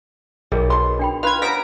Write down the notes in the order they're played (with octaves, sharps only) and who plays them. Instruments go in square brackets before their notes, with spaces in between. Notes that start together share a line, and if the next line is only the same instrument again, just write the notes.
[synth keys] B1 [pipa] G3 [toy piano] G#4 A#4 D#5
[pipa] B2 C6
[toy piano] D4 G5 B5
[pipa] F4 B4 [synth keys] F6 G#6
[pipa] G3 B3 C#4 [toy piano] B4 A#5 [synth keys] A#6 B6 D7